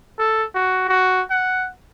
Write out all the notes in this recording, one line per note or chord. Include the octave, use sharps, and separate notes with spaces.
A4
F#4
F#4
F#5